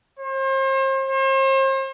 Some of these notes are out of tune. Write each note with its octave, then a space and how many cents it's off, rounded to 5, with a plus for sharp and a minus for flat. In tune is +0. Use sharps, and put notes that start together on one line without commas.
C5 +40
C5 +40